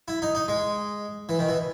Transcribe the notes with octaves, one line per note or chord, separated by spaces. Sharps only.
E4
D#4
D#4
G#3
E3
D#3
E3